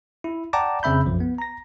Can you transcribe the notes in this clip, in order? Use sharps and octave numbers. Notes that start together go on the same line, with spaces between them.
E4
D5 F#5 G5 A5 A#5 D6
F2 C#3 C4 E5 B5 G6
B1 F#2 F3
B3
A#5 A#6